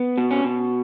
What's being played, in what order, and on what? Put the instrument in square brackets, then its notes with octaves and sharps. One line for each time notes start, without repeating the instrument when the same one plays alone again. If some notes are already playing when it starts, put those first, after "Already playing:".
Already playing: [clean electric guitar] B3
B2
C#4
B2